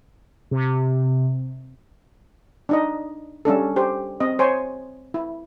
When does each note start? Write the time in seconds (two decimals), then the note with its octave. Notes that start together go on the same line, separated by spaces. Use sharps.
0.51 C3
2.69 D4 D#4 D#5
3.45 G3 C#4 D4 A4
3.76 G4 C5
4.20 C4 D#5
4.39 C5 C#5 G#5
5.14 E4